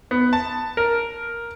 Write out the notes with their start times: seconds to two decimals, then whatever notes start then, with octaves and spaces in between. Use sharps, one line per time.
0.11 B3
0.33 A5
0.77 A#4